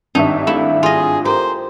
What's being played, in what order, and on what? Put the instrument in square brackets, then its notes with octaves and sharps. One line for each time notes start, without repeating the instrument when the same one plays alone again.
[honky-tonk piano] G#1 G2 E5 [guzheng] D#4 [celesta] A5 C#6
[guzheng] A3 E4 [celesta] F5
[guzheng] F4 D#5 [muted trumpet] G#4
[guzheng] G4 [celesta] A4 A#4 A#5 [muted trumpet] C5